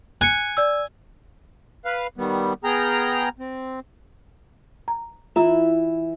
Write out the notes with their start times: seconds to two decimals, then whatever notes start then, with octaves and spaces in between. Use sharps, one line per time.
0.21 G#5 F#6 C#7
0.57 D5 E6
1.85 B4 F5
2.17 D#3 G3 B3
2.64 B3 G#4 G5 A#5 F6
3.39 C4
4.88 A#5
5.36 E3 E4 F4 E5 A#5